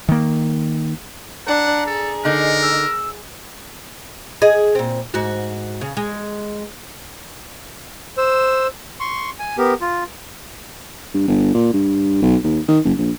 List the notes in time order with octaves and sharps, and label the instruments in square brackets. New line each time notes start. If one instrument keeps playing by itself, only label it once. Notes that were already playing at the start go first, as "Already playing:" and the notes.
[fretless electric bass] D#3 A#3
[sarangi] D4 [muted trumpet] F#5 [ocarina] A#5
[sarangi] G#4 [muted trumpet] A4
[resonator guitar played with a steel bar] D3 D#4 [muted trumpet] A#4
[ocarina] E6
[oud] G#4 D#5
A#2 C4
G#2 F#4
C#3
G#3
[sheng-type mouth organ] C5 E6
C6 C#6
G#5
B3 G4 A#4
F4
[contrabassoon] G2
G1
A#2
G2
B1
D#2
D#3
F#1
A#1